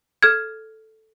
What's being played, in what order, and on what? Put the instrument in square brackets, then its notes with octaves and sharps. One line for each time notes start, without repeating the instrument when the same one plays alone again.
[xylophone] A4 F6 G#6